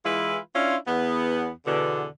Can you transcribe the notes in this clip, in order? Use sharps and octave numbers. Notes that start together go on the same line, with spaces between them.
E3 G#3 E4 F4 B4
C#4 D4 E4 F4
E2 B3
E2 B2 D3